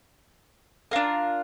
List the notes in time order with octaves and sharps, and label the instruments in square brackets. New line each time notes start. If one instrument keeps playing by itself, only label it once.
[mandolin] D4 F4 A#4